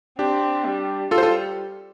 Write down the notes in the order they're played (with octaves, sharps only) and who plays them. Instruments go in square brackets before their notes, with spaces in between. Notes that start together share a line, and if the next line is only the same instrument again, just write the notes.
[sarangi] C4 [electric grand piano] D4 G4
[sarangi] G3
[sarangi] G3 [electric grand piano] F4 A4
[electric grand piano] C5
F4 A4